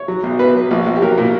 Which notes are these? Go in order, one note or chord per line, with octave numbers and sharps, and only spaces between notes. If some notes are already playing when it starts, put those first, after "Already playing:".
Already playing: C#5
F#3
B1
B2 B4
F#3
A#1
A#1
G4
F#3 A#4
A#2